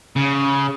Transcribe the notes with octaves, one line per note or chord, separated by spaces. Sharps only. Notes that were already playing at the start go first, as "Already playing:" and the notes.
C#3